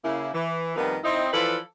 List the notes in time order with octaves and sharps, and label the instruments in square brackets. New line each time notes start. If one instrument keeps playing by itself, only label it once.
[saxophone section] C#3 A#3 E4
E3
F2 D#3 G3 A#3 B3
C4 D#4 E4
E3 F3 A4 B4 D5 F5